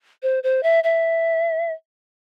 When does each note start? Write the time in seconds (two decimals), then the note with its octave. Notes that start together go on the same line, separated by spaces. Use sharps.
0.23 C5
0.43 C5
0.63 E5
0.84 E5